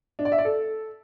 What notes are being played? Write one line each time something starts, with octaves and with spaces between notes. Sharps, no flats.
D4
D5
E5
D5
A4